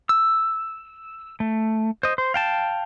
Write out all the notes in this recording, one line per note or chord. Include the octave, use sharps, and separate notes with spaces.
E6
A3
C5 D#5
C5
F5 G5 A5